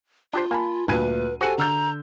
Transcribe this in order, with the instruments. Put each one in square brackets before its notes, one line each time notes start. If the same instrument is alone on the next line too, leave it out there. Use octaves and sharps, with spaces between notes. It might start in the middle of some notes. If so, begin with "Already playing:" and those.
[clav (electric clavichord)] D4 G4 C5 [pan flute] F4
[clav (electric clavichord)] A#3 [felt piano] G#5 A5 B5
[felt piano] D2 A#2 D#7 [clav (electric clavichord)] G2 G#5 [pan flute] B4
[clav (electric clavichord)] F#4 F#5 [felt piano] G4 A4 C5 [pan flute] G#5
[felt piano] D3 E6 G6 [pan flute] A#5